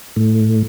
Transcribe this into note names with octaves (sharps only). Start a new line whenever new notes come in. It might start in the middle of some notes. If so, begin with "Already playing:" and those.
A2